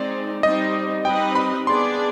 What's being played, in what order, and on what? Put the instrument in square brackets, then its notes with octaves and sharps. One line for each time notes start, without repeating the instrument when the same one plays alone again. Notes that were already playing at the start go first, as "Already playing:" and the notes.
Already playing: [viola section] G#3 C4 D#4 [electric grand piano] D5
[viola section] G3 C4 D#4 [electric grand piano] D#5
[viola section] G3 C4 D#4 B4 D#5 [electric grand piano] G5
[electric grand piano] B5
[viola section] B3 D4 G#4 D5 [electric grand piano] C6